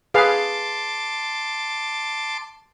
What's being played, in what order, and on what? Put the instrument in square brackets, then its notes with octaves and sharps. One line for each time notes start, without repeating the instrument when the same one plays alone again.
[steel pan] G#4 B4 F5 [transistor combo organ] A5 C6 D6